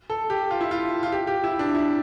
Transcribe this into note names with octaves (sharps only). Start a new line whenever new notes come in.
A4
G4
F4
E4
F4
F4
G4
G4
E4
D4
E4